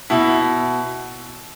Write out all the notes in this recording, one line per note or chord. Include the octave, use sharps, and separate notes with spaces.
B2 E4